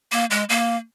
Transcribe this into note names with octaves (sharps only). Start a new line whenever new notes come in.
A#3
G#3
A#3